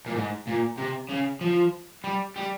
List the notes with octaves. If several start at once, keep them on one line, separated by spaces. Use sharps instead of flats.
A#2
G#2
A#2
C3
C#3
F3
G3
G3